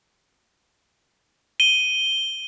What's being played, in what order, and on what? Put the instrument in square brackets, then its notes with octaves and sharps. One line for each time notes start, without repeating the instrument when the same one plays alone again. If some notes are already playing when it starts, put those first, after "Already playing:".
[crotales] D#7 G7